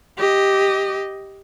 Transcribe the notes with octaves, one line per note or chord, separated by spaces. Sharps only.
G4 D#5